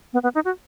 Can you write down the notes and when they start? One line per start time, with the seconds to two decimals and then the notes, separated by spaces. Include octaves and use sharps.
0.13 B3
0.23 B3
0.35 D#4
0.45 F#4